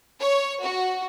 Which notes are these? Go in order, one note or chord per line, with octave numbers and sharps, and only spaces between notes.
C#5
F#4